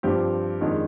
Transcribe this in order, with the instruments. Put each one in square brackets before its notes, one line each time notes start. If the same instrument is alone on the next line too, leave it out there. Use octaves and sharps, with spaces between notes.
[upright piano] G2 F3 C4 G4
F2 D#3 G#3 D4